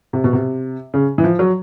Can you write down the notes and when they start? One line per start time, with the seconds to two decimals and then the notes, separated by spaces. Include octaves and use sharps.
0.13 C3
0.24 B2
0.33 C3
0.94 C#3
1.18 E3
1.24 F3
1.39 F#3